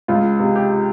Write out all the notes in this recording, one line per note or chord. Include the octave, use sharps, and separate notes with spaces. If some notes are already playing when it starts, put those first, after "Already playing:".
C#2 F4
C3
G4